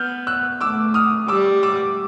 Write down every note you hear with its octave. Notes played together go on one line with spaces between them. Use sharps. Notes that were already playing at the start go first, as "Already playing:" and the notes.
Already playing: B3 F6 G6
E6 F#6
A3 D6 E6
D#6 F6
G3 D6 E6
D6 E6